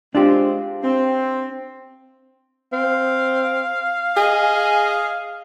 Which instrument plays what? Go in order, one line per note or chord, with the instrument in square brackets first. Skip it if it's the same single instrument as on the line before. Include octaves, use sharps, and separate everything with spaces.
[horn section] G#3 C4 [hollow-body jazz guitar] D4 F4 G4
[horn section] C4
[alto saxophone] C4 [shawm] F5
[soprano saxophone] G#4 [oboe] D#5 [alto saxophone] G#5